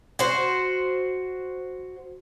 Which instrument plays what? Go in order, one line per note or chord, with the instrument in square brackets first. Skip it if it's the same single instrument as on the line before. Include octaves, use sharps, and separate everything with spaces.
[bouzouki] F#4 C5